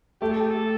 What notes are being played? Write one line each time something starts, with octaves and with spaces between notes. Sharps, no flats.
A3 G4
A4
G4
A4